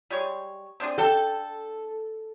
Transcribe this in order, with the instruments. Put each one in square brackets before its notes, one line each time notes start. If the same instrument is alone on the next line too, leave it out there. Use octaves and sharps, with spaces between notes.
[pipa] G3 G#3 C#5
C4 D4 G#4
[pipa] D4 G5 [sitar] A4